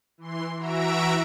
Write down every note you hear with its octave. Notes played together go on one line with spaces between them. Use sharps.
E3 C6
E3 F#4 E5 A#5 E6 D7